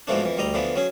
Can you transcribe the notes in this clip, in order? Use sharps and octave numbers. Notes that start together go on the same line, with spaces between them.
G#2 B2 E3 F3 A3 D4
F2 E3
D2 G3 D#5 A#5
D3 E3 F3 B3
F#3 C#4 G#4